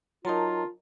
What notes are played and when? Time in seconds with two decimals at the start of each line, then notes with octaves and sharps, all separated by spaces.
0.25 F#3 D#4 F4 A#4 A5 A#5